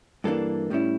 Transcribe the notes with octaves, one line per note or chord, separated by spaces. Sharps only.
G2 E3 A#3 D4 A4
A2 G3 C#4 E4